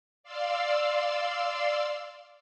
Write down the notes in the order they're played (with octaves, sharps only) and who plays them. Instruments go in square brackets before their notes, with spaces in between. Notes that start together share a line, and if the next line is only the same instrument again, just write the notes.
[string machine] D5 F5 C6 E6